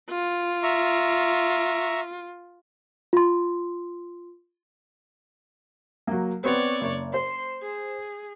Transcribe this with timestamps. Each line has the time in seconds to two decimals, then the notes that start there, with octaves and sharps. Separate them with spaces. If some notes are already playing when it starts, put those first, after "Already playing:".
0.10 F4
0.63 E5 A#5 C#6
3.13 F4 C6
6.07 F#3 A#3
6.44 B3 C4 C#5 D5
6.81 F#1
7.14 C5 C6
7.62 G#4